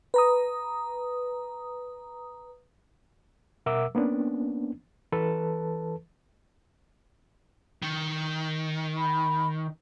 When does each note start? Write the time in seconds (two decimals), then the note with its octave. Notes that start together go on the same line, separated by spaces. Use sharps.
0.14 B4 A#5 D#6
3.66 B2 A#4 E5 F#5 D6 E6
3.95 A#3 B3 C#4 D4
5.12 E3 A4 B4 A5
7.82 D#3
8.97 B5